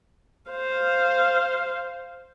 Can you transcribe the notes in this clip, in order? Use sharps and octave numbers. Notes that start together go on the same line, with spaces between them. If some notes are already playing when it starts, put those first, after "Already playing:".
C5 F5